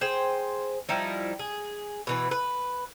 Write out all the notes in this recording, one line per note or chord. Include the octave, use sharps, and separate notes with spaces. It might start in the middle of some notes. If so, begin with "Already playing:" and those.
G#4 C5 G5
F3 G3 D#4 E4
G#4
B2 E3 B4
B4